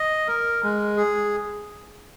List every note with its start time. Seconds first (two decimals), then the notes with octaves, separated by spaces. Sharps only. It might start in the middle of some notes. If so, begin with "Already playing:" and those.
Already playing: D#5
0.28 A#4
0.63 G#3
0.97 G#4